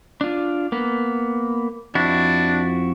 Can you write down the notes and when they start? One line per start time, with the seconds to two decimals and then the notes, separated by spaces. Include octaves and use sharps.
0.21 D4 F4
0.72 A#3 B3
1.95 F2 D4 E4 F#4